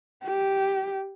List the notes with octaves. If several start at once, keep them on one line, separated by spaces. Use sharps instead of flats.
G4